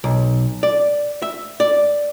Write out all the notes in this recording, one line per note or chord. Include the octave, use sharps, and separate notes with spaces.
B1
D5
E5
D5